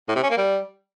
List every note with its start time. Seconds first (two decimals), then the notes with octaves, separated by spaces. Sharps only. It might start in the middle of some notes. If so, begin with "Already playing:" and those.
0.08 A2
0.16 C3
0.23 C#4
0.30 A#3
0.38 G3